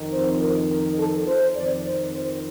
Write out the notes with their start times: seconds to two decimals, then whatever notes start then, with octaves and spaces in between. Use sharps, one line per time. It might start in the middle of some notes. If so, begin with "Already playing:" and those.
Already playing: F2 D#3
0.12 C5
0.41 A#4
0.71 A#4
0.98 A4
1.27 C5
1.56 F2 D#3 D5
1.85 C5
2.14 C5